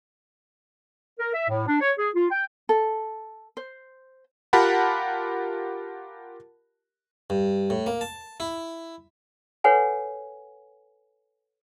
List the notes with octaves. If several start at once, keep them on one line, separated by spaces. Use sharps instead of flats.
A#4
E5
A2
D4
C#5
G#4
F4
G5
A4
C5
F4 G4 A#4 F#5 A5 B5
G2
A2
A#3
A5
E4
A4 B4 C#5 F#5 G#5